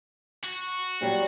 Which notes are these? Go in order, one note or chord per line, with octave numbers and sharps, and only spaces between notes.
F#4
A#2 F#3 G3